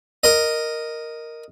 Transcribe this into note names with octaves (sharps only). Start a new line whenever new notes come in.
A#4 D#5